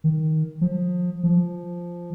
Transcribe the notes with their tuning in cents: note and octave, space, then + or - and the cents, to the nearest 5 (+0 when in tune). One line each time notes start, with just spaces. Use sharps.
D#3 +10
F3 +30
F3 -5